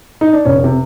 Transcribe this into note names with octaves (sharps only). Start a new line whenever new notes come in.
D#4
D4
F1 C#4
C3